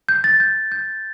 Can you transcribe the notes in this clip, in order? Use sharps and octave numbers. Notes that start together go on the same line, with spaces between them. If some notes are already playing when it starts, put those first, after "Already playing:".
G6
A6
G6
G6